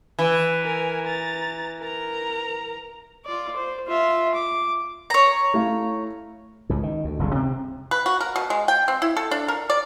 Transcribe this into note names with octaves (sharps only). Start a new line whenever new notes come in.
E3
A#4 G#5
A#5 A6
A#4 A#5
F4 D5
C5
F4 E5
D6
C#5 A#5
A3 E4 F5
C#2 A2
D#3
D2
F#1 C2 A#2 C#3
C3 C4
B4
F#4
A#4
B2
G#3
G5
C4
E4
A4
D4
A#4
D5